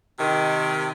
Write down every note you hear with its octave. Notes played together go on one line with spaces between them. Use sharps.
C3 D#3